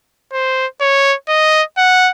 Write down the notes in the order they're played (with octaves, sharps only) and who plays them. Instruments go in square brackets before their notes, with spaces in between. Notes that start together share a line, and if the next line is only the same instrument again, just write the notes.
[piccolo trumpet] C5
C#5
D#5
F#5